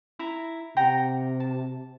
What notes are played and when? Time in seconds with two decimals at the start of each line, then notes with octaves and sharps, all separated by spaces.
0.19 E4 E5 A#5
0.77 C3 F#5 G5 A#5
1.40 A5